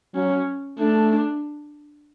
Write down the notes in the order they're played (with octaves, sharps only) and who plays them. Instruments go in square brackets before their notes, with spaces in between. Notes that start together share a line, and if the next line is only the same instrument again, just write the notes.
[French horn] F#3 [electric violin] C#4
[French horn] A3 [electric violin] D4